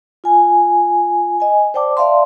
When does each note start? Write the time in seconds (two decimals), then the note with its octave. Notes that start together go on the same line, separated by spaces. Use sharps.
0.24 F4 G#5
1.40 D#5 G#5
1.74 C5 D5 G5 A5 D6
1.97 D5 E5 F5 A5 C6